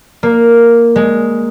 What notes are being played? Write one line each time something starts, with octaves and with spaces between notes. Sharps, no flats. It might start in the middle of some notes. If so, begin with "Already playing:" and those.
A#3
G#3